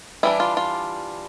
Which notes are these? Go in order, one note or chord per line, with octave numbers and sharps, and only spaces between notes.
E3 G3 D4 E4
F4
F4